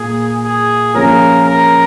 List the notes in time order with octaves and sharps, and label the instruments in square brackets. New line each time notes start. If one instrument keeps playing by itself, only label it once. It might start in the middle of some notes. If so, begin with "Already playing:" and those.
Already playing: [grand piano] A#2 A#3 [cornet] G#4
[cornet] G#4
[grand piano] F3 A#3 C#4 G#4 [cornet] A#4
[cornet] A#4